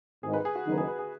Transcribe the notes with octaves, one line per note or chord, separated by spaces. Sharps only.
G#1 G#2 D#3 G#3 G#4
B4
G#4
F#4
F#1 F#2 D#3 B3 D#4
G#4
B4
G#4